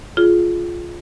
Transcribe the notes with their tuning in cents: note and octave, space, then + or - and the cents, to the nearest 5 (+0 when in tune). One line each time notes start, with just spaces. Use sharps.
F4 +0 G#4 +20